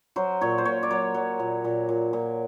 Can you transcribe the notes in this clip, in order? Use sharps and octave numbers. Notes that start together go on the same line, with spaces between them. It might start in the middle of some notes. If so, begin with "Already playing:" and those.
F#3 C5
A#2 C#5
C5
A#2 C#5
D5
F#3 C#5
F#3
A#2
A#2
A#2
A#2